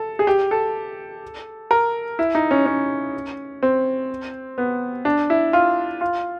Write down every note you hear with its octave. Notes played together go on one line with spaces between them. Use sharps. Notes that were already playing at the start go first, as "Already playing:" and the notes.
Already playing: A4
G#4
G4
A4
A#4
E4
D#4
C#4
C#4
C4
B3
D4
E4
F4
F4